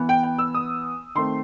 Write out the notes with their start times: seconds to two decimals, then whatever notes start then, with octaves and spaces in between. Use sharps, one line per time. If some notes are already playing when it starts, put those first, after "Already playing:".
Already playing: E3 B3
0.09 G5
0.23 G5
0.38 E6
0.54 D#6
1.15 D#3 A3 C4 C6